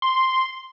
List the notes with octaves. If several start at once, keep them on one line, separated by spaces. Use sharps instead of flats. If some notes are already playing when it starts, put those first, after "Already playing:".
C6